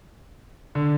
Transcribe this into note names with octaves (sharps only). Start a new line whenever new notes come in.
D3